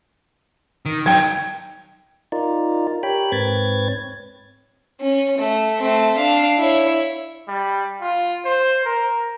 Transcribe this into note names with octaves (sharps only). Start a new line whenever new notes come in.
D#3
F#3 D#4 G5 G#6
D#4 F4 A#4 D5
G4 A#4 C#5 G5 B5
G#2 C4 B4 C#5 G#6 A6
C#4
A3
A3 C4
D4 F5
E4 C#5
G3
F4
C5
A#4